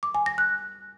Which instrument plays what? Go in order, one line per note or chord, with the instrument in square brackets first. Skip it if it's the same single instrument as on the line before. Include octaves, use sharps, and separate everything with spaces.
[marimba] D6
G#5
A#6
F#6